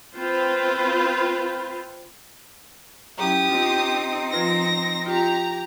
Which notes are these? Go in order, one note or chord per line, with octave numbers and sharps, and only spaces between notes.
C4 F4 B4 C5
F#3 C#4 E4 G4 A#5 D#6
C4 D4 D#4 F4
F3 F4 B4 A#6
F4 G4 A#5